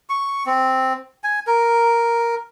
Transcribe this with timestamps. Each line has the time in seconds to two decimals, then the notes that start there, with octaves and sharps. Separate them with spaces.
0.09 C#6
0.46 C4
1.24 G#5
1.47 A#4